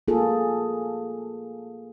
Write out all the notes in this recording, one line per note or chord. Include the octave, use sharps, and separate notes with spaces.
A#3 F4 G#4 A4